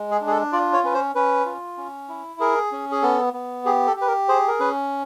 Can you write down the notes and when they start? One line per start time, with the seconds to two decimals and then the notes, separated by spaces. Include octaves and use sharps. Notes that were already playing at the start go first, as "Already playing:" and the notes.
Already playing: G#3
0.11 G#4
0.21 D4
0.27 G#4
0.32 A4
0.52 F4 D5
0.73 C#5
0.84 C#4 B4
0.94 C5
1.15 C#4 B4
1.46 F4
1.77 C#4
2.09 E4
2.40 G#4 A#4
2.72 C#4
2.92 G#4
3.02 B3 A4
3.33 B3
3.65 G4 G#4
3.87 A4
3.96 G4
4.01 B4
4.07 A#4
4.29 G#4 C5
4.48 A#4
4.60 C#4 B4